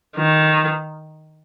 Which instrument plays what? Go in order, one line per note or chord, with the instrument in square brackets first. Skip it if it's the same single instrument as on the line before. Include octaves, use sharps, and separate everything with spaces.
[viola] D#3